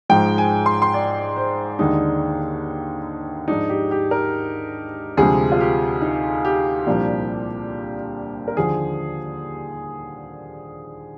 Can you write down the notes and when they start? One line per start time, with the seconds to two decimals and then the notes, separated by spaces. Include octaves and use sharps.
0.09 G#2 F3 G#3 G5
0.38 G#5
0.66 C6
0.82 C6
0.94 D5
1.36 C5
1.79 D#2 D3 G#3 D4 D#4
3.48 G#2 F3 G#3 D4 D#4
3.69 G4
3.91 G4
4.11 A#4
5.17 D2 C3 F3 G#3 G#4
5.52 F4
5.61 G4
6.02 D#4
6.45 G4
6.87 C2 A#2 F3 A#3 D4
8.48 A#4
8.57 D#2 D3 F3 G#4